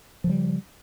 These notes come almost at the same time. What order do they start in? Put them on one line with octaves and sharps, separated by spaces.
F3 C#3 G3